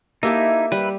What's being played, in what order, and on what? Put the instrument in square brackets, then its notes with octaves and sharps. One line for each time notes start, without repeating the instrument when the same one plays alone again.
[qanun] A#3 G4 A4 [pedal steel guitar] D#4 E4 [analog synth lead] E5
[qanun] G3 [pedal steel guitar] B4